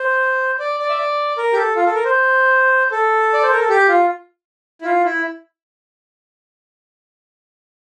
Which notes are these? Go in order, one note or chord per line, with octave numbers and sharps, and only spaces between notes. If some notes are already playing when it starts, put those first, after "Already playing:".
Already playing: C5
D5
D5
E5
D5
A#4
G4
A4
F4
A4
A#4
C5
A4
D5
C5
A#4
A4
G4
F4
E4
F4
E4